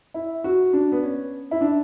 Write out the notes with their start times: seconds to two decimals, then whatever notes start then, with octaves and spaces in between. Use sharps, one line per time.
0.14 E4
0.44 F#4
0.73 D4
0.92 B3
1.03 C#4
1.51 E4
1.61 D4